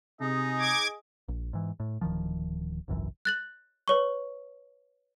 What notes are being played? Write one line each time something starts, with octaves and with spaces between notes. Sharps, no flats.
C3 D#4 G#4 D#5
D6 G#6
A#1
G#2 E3
A2
D1 D#3 F3
G#1 C#2 F#2 E3
F#6 A6 F#7
B4 C#5 C#6